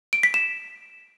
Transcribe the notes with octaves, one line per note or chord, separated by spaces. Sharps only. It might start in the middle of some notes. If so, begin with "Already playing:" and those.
D7
B6
E7